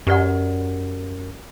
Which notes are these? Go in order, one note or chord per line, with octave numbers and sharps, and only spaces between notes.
F#2 G4 B4 D5 F#5